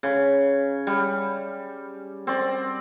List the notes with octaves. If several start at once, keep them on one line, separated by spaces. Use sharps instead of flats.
C#3
G3
C4 D5